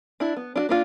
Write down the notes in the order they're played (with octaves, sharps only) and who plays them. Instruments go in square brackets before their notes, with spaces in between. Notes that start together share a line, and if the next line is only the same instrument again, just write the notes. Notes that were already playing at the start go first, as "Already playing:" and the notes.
[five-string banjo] D4 E4
B3
D4 F4 F#4
A#3 D4 F4